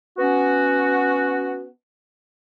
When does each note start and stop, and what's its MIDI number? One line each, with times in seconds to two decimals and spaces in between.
0.18 1.67 59
0.18 1.67 61
0.18 1.67 66